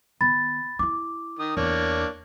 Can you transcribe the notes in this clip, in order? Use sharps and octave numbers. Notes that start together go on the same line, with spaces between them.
D#3 B3 B5 A6
D#4 E4 D6
D#3 D#6
E2 A#3 D4 C#5